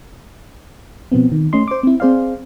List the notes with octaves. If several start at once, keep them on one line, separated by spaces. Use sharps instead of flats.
B2 F3 B3 C4
D#3
A3 C#4 D#5 C6
C5 D6
C4 E4
C4 G#4 C5 D5 F5